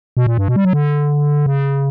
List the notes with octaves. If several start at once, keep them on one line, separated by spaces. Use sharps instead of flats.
B2
A#2
G2
B2
G3
F#3
D3
C#3